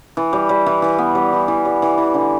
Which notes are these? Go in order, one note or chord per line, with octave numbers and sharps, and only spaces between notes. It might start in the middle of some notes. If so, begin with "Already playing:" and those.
E3
G3
G3
E3
E3
B3
G3
E3
E3
G3
E3
E3
D3